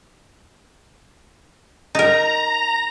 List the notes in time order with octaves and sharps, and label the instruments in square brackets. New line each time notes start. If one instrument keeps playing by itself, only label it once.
[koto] D#4 A#4 [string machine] A#5